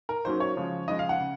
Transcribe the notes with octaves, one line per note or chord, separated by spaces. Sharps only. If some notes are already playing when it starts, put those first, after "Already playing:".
A#4
G#2 F#3 A#3 C#4 C5
C#5
C#3 F3 G#3
C#3 F3 G#3 D#5
F5
F#5
C#3